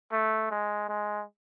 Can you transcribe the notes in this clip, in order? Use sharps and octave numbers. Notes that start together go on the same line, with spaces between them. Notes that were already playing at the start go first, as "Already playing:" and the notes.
A3
G#3
G#3